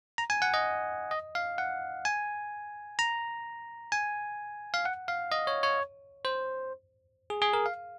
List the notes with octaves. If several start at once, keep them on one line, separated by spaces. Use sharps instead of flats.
A#5
G#5
F#5
D#5
D#5
F5
F#5
G#5
A#5
G#5
F5
F#5
F5
D#5
C#5
C#5
C5
G#4
G#4
A#4
F5